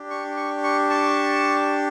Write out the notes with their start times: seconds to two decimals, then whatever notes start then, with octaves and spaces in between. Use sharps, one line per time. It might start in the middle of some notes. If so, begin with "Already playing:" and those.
Already playing: D4 G4
0.10 C#6
0.37 C#6
0.64 C#6
0.90 A5 C#6